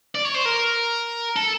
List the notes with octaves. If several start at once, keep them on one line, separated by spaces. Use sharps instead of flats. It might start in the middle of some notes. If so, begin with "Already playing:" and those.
D5
C#5
C5
A#4
A4